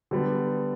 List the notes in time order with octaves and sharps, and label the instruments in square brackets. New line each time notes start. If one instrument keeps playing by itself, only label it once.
[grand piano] D3 G3 B3